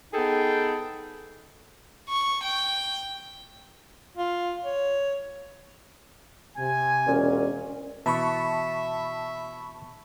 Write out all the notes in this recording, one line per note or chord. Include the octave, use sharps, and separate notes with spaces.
B3 D#4 G#4 A4 G5
C#6
G5
F4
C#5
C3 G#5
E1 A#2 C#4
B2 E3 E5 A5 B5 C#6